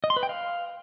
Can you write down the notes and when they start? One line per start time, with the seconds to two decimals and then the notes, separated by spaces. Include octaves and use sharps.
0.04 D#5
0.10 C6
0.16 B4
0.23 G5
0.29 F5